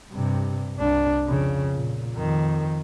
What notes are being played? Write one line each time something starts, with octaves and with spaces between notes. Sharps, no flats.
G2 C3
C2 D4
F2 C#3
A#2
F2 D#3